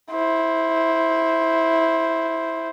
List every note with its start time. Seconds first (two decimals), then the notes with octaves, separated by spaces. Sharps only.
0.12 E4 C5